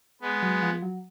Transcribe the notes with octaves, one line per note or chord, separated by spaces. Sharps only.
G#3 B3
F#3
F3
F#3